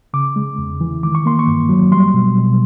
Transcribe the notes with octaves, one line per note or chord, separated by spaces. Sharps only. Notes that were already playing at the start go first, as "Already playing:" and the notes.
C#3 D6
G#3
E2
E3
D#3 D6
C#6
A#3 C6
C#6
G2
F#3
G3 C6
B2
B2